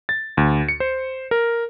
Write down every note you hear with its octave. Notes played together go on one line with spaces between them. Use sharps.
A6
D2
C#7
C5
A#4